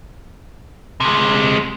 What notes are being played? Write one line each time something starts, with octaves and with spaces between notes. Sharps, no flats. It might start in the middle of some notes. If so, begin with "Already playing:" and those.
C3 G#3